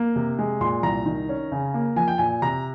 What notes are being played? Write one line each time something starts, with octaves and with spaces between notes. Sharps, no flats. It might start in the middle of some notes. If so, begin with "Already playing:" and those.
Already playing: A#3
C3
G#3
A#2 C6
C2 A#5
D#3
C#4
C#3
A#3
F3 G#5
G5
A#2 G#5
C3 A#5